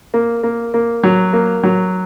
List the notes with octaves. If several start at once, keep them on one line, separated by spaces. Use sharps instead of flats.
A#3
A#3
A#3
F#3
A#3
F#3